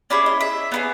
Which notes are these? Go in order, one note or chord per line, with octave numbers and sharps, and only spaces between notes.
C#4 E4 G#4 D5
D#5
E5
B3 E4 G#4